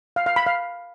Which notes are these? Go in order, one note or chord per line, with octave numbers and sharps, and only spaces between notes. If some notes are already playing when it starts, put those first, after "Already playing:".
F5
F5
B5
F5